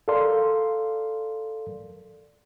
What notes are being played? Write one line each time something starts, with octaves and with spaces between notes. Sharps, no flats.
A4 A#4 D5 F5 C6